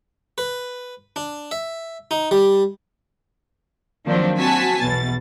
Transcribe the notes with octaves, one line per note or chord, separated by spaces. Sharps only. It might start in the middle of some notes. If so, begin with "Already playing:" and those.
B4
D4
E5
D#4
G3
D#3 F3 F#3 A#3 C4 D4
C4 F#4 G#5 A5 B6
B1 E2 B2 A6